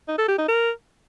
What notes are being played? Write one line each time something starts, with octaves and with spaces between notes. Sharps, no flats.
D#4
A4
G4
D#4
A#4